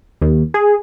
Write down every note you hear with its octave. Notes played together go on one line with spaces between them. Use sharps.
D#2
G#4